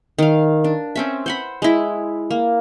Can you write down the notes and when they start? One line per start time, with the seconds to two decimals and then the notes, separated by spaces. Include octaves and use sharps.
0.19 D#3 F5
0.64 D4
0.95 C4 C#4 E5
1.26 C5 F#5 B5
1.62 G#3 E4
2.31 A#3